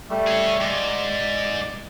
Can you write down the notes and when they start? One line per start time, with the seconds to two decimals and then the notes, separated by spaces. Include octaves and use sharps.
0.10 G3 A3
0.27 G#4 C#5
0.61 G#2 D5